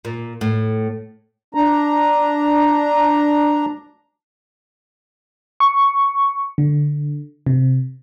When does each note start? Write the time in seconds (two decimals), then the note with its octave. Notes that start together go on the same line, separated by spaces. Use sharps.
0.05 A#2
0.41 A2
1.55 D4 A#5
5.60 C#6
6.58 D3
7.47 C3